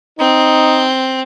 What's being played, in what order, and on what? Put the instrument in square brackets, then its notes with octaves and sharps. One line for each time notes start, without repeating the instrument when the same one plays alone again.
[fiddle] C4 [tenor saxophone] D#4